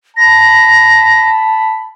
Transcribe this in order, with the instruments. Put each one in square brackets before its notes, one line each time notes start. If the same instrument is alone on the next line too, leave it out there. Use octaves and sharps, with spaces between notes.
[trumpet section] A5 B5 [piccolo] A#6